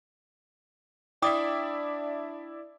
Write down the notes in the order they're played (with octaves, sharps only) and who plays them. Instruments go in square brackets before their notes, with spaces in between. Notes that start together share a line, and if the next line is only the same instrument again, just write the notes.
[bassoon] D4 [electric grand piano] E4 D5 E5 [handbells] G5 D6 D#6